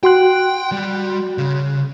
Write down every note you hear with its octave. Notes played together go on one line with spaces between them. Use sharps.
F#4 G5 C6 F#6
G3
C#3